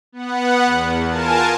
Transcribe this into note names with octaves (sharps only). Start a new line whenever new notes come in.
B3 F#5
E2
F4 A#4 G#5 A5